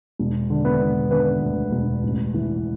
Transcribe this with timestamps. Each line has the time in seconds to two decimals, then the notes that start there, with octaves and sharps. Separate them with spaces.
0.19 E1
0.50 D3
0.65 B3 B4
0.81 E1
1.11 D3 B3 B4
1.42 D2
1.72 E1
2.03 A1
2.34 E3